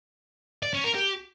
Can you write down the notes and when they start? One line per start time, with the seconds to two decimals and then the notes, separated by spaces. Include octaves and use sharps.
0.63 D5
0.73 C#4
0.84 A#4
0.95 G4